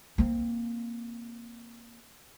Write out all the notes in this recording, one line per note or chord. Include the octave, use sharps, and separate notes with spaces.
A#3 C4